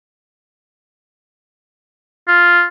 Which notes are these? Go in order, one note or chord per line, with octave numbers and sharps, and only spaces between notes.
F4